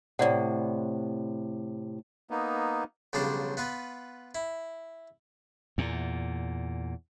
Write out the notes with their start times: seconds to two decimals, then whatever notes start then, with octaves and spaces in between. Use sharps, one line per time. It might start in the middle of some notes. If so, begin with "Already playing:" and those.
0.19 A2 C3 D5 F#5
2.30 A#3 B3 D#4
3.13 B1 C#3 F3 G3 D4 C5
3.57 B3 F4 B4
4.35 E4
5.78 E2 A#2